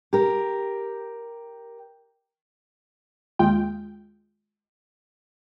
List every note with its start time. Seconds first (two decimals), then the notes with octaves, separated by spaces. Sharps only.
0.13 G4 A#4
3.39 D#2 G#3 F4 G5